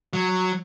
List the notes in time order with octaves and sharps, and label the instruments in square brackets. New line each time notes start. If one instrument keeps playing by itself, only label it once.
[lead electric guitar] F#3